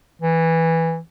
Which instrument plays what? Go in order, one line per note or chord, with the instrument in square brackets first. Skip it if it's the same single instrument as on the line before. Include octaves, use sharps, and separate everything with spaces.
[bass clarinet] E3